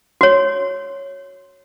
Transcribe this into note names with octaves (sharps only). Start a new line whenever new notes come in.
F#4 C#5